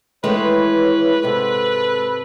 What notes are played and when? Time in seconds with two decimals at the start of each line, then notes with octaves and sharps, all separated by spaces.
0.24 D#3 E3 G#3 A3 B4 C#5
1.23 G#2 C3 A4